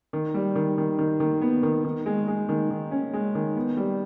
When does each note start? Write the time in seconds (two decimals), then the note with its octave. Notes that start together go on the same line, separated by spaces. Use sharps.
0.13 D#3
0.34 G3
0.56 D#3
0.78 D#3
0.98 D#3
1.20 D#3
1.41 B3
1.63 D#3
1.84 D#3
2.06 G#3
2.28 G#3
2.49 D#3
2.70 D#3
2.91 C#4
3.13 G#3
3.35 D#3
3.56 B3
3.77 G3